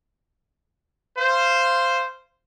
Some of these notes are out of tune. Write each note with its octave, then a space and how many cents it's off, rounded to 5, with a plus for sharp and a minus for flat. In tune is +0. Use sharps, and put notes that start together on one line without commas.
C5 +0 F5 -20